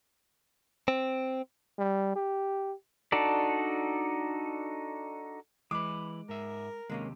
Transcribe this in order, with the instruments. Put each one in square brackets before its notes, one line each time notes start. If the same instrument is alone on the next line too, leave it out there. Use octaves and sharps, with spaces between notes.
[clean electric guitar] C4
[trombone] G3
G4
[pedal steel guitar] D4 D#4 F#4 A4 D5
[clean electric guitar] E3 B4 [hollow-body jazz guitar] G#3 [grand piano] D6
[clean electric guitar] G#2 E5 [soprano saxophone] A#4
[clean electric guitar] D#2 C3 [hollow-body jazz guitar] G#3 A#3 C#4